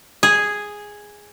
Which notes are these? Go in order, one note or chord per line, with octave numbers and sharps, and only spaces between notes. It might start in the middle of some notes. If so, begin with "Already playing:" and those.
G#4